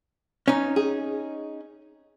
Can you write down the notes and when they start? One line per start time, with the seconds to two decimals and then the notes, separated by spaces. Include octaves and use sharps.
0.48 C#4 D#4
0.76 G#4